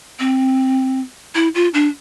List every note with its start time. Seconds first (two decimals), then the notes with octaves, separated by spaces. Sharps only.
0.19 C4
1.35 E4
1.55 F4
1.74 D4